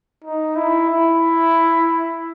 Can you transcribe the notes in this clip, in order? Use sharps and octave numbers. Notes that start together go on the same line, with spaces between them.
D#4
E4
E4